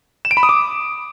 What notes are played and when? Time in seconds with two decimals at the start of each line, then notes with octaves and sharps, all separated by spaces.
0.25 E7
0.31 D7
0.37 B5
0.43 D#6
0.49 D6